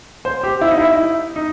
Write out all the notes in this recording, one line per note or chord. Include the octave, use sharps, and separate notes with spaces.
C5
G4
E4
D#4
E4
D#4